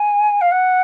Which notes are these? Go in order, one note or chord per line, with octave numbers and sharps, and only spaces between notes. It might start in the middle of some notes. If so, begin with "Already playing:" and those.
Already playing: G#5
F5
F#5